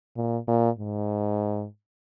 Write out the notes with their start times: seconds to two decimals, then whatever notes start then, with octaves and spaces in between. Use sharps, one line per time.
0.16 A#2
0.48 A#2
0.78 G#2